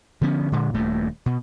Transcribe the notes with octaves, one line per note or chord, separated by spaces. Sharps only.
D3 F3 B3 C#4
A#2 D3 G#3
D#1 G2 A#2 A3
B2